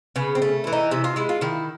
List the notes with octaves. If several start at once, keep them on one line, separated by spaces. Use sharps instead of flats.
C#3 B3
C4
A3
E3 E4
D#4
C3 E4
F4
G#3 E4
F4
D#3 E4